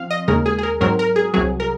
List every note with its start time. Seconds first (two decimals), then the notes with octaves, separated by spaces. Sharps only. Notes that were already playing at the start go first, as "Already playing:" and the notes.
Already playing: F3 C4 F5
0.11 D#5
0.28 D#2 C#3 G#3 A#4
0.46 G#4
0.58 G#4
0.63 A#4
0.81 G#2 F#3 C4 A#4
0.99 A#4
1.16 G#4
1.34 C2 C3 F#3 G#4
1.60 A#4